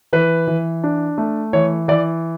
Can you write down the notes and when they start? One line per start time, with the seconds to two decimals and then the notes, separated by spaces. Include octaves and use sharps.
0.13 E3 B4
0.48 E3
0.84 D4
1.18 A3
1.53 E3 C#5
1.88 E3 D5